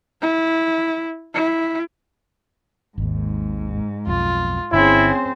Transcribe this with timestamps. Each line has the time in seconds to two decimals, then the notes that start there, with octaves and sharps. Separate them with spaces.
0.21 E4
1.34 E4
2.98 G#1 D#2 G#2
4.07 B1 F2 F4
4.72 G1 D3 C4 C#4 E4 G#4 C5